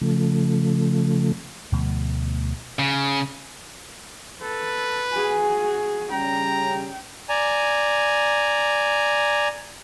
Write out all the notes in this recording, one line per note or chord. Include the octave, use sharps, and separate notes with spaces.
C#3 F3 A3
D2 B2 F3 A3
C#3
A4 B4
F#4 G#4 G#5
C#3 G3 C#4 G5 A#5
D5 G#5 A#5